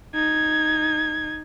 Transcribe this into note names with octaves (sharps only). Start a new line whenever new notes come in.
D#4 G#6